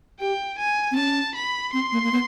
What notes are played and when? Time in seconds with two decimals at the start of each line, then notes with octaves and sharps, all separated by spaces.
0.20 G4 G5
0.59 G#5
0.91 C4
0.96 C#4 A5
1.35 B5
1.73 C4 C6
1.92 A#3
2.03 A#3
2.11 B3